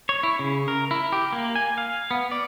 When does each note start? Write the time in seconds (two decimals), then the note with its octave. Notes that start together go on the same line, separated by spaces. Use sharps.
0.09 C#5
0.23 E4
0.39 C#3
0.68 A#4
0.91 E4
1.12 G4
1.33 A#3
1.56 G#5
1.78 F5
2.11 B3
2.31 D5